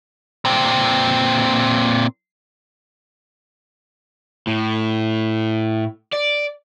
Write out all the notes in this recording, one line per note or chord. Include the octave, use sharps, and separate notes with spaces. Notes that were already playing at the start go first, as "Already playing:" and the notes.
A#2 C4
A2
D5